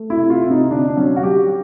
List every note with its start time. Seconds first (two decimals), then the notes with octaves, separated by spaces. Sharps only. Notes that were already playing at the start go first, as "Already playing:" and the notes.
Already playing: A3
0.10 E4
0.17 C3
0.30 F4
0.44 C3
0.50 D#4
0.70 D3 D4
0.88 D4
0.97 F#3 C#4
1.16 F#4
1.23 F#3 G4